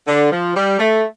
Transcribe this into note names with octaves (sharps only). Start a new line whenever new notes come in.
D3
F3
G3
A3